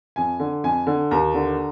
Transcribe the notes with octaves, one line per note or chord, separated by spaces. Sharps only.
F2 G#5
D3
F2 G#5
D3
D#2 A#5
D3